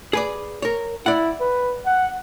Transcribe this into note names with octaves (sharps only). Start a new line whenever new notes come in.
G#4 B4 D5
A#4 C#5
E4 D5 F#5
B4
F#5